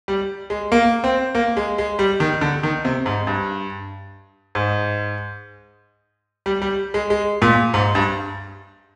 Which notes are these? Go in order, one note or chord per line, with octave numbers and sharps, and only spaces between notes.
G3
G#3
A#3
C4
A#3
G#3
G#3
G3
D#3
D3
D#3
C3
G#2
G2
G#2
G3
G3
G#3
G#3
A#2
G#2
G2